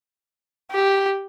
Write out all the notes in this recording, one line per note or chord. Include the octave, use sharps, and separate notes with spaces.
G4